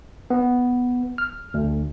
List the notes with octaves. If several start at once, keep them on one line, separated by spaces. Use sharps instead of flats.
B3
F6
D2